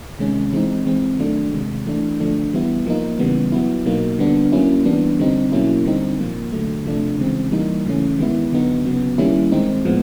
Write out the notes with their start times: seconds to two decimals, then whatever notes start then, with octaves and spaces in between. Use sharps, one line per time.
0.19 C3 D#3 G#3 C#4
0.53 E3 G#3 C4 D#4
0.86 E3 G#3 C4
1.19 D#3 F#3 A3 D4
1.53 C3 D#3 G#3
1.86 E3 A3 D4
2.19 D3 F3 A3 D4
2.53 E3 G3 B3 E4
2.86 F3 A#3 D#4
3.19 C#3 E3 G3 B3
3.52 F#3 B3 E4
3.86 B2 F#3 A#3 D#4
4.19 D3 G3 B3 D4
4.52 F#3 A#3 C#4 E4
4.85 E3 G3 B3 D4
5.19 D3 G3 C4 D#4
5.52 B2 F#3 A#3 C#4 E4
5.85 D3 G3 C4 D#4
6.19 A#2 F3 A#3
6.52 D3 F#3 A3
6.85 C3 F3 A3 D4
7.19 C#3 E3 G#3 C4
7.52 E3 G3 A#3 D#4
7.86 C#3 E3 A3 C#4
8.19 D#3 G#3 B3 E4
8.52 D3 F#3 B3 D#4
8.85 C#3 F#3 B3
9.18 D#3 G3 A#3 C#4 E4
9.52 D#3 G#3 C4 D#4
9.85 A2 F3 G#3 B3